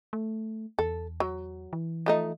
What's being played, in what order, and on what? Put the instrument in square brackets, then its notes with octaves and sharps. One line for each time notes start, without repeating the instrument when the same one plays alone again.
[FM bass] A3
[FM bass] E2 [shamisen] A4
[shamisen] F#3
[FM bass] E3
[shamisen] F3 A3 D#4